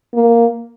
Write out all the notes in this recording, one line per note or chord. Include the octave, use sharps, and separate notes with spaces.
A#3